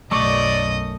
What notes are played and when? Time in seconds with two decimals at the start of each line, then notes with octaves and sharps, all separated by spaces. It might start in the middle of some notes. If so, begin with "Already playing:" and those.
0.11 B1 F#2 A3 D5 D#5 C#6